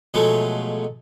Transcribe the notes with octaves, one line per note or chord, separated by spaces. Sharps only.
B2 F3 F#3 G#3 A3